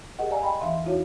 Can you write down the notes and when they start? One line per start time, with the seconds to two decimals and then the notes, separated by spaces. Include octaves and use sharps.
0.19 G4 G#4 A#4 D#5 F#5
0.31 D5 F5 G#5 A#5
0.43 D#5 G5 B5 C6
0.61 E2 E3 E5 F5 C6
0.86 D#4 E4 F#4 C#5 F5